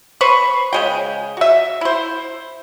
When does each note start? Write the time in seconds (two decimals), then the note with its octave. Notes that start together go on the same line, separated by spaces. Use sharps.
0.21 B4 C5 B5 C#6
0.73 C#3 G#3 G5
1.37 F#4 E5
1.81 E4 C5